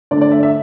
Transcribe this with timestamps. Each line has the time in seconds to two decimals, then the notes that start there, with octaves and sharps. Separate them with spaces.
0.11 D3 A3 D4 D5
0.21 D5
0.32 E5
0.43 E5